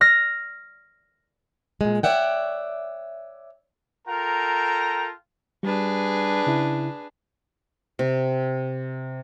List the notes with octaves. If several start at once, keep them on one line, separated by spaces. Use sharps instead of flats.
F6 A#6
A#2 G#3
C#5 D5 E5 F#5 G5
F4 A4 A#4 G5 A#5
G3 D4 G#4 B4
C#3 E4
C3